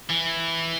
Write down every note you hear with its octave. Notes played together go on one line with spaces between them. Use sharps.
E3